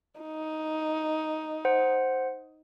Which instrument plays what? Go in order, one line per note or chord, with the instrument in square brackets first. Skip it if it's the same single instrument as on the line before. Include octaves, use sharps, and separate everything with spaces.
[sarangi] D#4
[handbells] C5 F#5